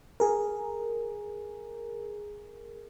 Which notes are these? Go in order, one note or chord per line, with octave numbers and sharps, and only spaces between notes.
G#4 A#4